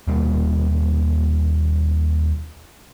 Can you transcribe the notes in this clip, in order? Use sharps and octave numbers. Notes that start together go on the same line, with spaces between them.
D#2 B2 G3 A#3